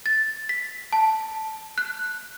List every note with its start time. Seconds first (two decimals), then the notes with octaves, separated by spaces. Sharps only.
0.06 A6
0.49 B6
0.93 A5
1.78 F#6